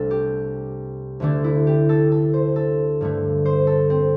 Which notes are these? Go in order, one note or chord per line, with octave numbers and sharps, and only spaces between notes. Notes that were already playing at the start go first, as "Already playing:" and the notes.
Already playing: C2 C3 A3 D4 A4
G4
D2 D3 A3 D4
E4
G4
A4
A4
C5
A4
G2 D3 A3
C5
A4
C4